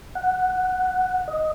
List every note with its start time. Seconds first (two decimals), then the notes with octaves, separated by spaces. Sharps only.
0.15 F#5
1.28 D#5